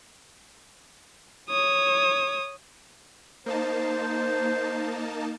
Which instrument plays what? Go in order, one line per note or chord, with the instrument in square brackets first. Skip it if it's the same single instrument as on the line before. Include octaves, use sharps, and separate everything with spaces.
[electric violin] C#5 D#6
[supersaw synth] A#3 D#4 A5 [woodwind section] C5